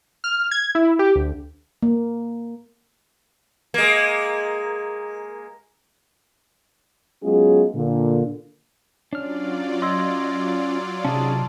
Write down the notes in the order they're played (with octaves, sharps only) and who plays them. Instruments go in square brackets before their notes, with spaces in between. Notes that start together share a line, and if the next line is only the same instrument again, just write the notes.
[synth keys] F6
G#6
E4
G4
D2
[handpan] A#3
[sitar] G#3 A#3
[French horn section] F#3 G#3 B3 C#4 F4 G#4
A#2 D3
[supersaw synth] F#3 F4 D5 [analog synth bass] C#4 [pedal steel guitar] D4 F6
[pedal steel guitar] D#5 [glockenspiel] C6 E6 G#6
[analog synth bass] C3 [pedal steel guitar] C#4 D#4 G#4 [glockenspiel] A5